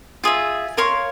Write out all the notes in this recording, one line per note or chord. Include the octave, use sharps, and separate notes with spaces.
F4 G#4 E5
A#4 C#5 F5 C6